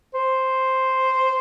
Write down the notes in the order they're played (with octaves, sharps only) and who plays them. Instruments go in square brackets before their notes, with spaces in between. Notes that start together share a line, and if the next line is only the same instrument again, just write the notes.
[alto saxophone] C5